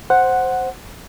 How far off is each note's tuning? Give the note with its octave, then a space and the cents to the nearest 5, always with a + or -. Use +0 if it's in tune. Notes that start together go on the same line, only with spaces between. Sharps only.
C5 +0 F#5 +0